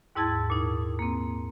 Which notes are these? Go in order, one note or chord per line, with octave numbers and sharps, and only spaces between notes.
D#2 G#2 E4 A5 G#6 A6
A#2 D#4
A#3 C4